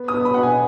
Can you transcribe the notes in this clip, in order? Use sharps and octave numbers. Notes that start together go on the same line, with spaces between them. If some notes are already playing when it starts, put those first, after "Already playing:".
Already playing: B3
D#6
B3
B5
B2 F#5
G#5